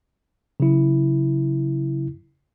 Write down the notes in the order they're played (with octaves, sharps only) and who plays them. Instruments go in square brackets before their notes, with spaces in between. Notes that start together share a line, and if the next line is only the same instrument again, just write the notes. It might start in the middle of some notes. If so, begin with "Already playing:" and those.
[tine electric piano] C#3 F#3 E4